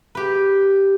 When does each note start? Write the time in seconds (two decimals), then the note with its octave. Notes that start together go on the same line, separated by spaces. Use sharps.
0.15 G4 B4